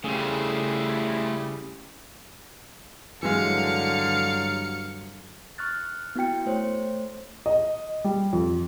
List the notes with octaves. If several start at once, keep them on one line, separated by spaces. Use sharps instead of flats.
C#3 G3 A3 E4 G#4 C5
G2 D3 E3 F#3 G#3 F5 C#7
C#6 F6 F#6 A6
B3 E4 F#4 G5 C#7
A3 C5 C#5
D#5
G3
F2